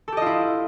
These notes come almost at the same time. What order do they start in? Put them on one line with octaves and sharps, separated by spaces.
A4 G4 D#5 F4 E4